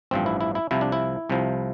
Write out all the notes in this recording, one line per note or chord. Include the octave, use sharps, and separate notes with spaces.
A1 G2 F3 C4
E4
E4
E4
C2 C3 F3 E4
D4
E4
C2 C3 F3